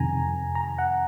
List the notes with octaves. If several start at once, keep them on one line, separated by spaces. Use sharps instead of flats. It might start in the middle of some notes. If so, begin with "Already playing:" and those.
Already playing: F2 C3 D#3 G#5 A#5
A#5
F#5